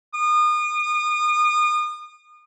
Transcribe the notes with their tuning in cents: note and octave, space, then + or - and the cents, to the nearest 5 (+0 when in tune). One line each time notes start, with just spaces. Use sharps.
D#6 -35